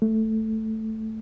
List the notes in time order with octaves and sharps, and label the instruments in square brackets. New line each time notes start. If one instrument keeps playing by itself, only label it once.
[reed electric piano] A3